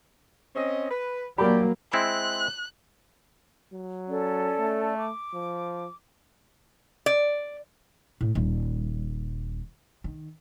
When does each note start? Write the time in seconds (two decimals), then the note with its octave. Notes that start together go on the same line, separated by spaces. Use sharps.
0.56 C4 C#4 D#5
0.91 B4
1.38 F#3 A#3 D4 G4 A#4 D5 B5
1.93 G#3 C4 E4 F#6
3.73 F#3
4.07 C#4 A4 D5
4.59 A3
4.96 D6
5.34 F3
7.06 D5
8.21 A2
8.35 D#1 G3
10.04 D#3